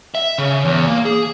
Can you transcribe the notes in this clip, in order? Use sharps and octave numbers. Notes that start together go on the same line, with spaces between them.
E5
C#3
E2
A#3
G#4